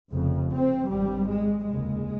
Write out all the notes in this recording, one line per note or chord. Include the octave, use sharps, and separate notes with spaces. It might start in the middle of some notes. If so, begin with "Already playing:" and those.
F1 F2 C#3
C4
G#1 G2 G3
G#3
F1 D#2 C#3 G#3